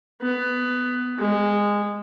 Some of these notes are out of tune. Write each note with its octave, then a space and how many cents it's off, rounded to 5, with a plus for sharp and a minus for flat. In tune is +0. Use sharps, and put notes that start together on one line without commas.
B3 +15
G#3 -15